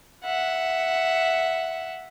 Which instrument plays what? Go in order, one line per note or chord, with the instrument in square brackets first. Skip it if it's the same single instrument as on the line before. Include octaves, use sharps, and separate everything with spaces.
[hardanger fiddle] E5 F#5